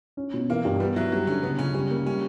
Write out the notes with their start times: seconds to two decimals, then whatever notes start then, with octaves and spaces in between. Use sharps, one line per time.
0.17 C#4
0.34 B2
0.50 E3 A#3
0.65 G2
0.80 G3 B3
0.96 F#3 E4
1.12 F#3 G3
1.27 D3 C#4
1.43 C#3 B3
1.59 C#3 C#4
1.74 G3 C#4
1.90 A#3
2.06 G3 C#4